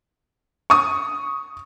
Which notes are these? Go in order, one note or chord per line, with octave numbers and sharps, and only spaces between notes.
C#6 D#6